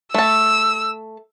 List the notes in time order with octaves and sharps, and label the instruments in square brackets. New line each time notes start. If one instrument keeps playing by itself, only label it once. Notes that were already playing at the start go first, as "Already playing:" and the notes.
[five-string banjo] A3 A5 [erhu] E6